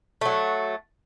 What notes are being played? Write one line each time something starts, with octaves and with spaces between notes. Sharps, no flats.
F#3 A3